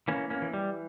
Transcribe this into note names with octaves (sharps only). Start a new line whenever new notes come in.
E3 A#3 C#4
A#3 C#4
E3
G3